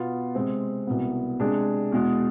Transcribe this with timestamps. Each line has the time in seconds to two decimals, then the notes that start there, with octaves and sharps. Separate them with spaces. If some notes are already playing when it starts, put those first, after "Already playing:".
Already playing: B2 B3 F4
0.35 C3 G#3 C4
0.87 C2 B2 B3
1.40 C3 G#3 D4 G#4
1.92 E2 B2 G#3